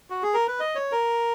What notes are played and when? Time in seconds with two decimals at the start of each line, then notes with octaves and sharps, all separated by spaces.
0.10 F#4
0.23 G#4
0.34 A#4
0.47 B4
0.60 D#5
0.75 C#5
0.92 A#4